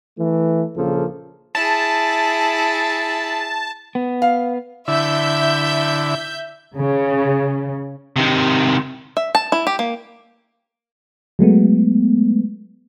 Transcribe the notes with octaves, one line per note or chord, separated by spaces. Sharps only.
E3 A3
A#1 C#3 F3 A#3 A4
E4 G#4 A5
B3
F5
D3 E4 E5 G6
C#3
C3 D#3
E5
A5
E4
G4
A#3
F#3 G#3 A3 B3